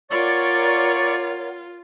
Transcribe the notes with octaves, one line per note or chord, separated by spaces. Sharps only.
F4 A#4 C#5 D5 F#5 C#6